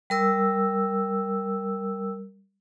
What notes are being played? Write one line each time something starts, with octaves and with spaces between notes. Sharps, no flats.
G3 A#4 E6